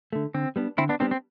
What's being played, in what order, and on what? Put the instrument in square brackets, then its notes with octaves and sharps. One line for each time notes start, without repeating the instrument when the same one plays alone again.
[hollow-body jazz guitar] D3 A3
[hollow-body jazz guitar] D3 [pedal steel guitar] C4
[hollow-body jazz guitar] G3 B3 D4
[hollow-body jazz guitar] D3 [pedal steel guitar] C4 E4
[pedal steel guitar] B3 D4
[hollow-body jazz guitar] G3 B3 D4 [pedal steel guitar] C4
[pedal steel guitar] C4